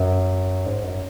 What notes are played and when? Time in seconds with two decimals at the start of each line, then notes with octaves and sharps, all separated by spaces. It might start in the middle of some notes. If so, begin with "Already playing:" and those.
Already playing: F#2
0.66 G#2
0.84 F#2